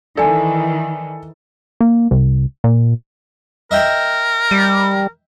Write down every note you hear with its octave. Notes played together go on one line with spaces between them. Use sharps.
D#3 E3 A4 D5 G#5
A#3
C2
A#2
A#4 D#5 E5 G5
G3